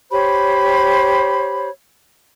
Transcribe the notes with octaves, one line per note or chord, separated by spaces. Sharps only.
G4 C5 C#5 B5